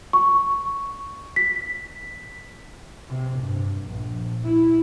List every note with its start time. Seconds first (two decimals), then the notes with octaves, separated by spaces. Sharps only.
0.13 C#6
1.36 B6
3.09 C3
3.40 G2
3.83 A#1
4.45 E4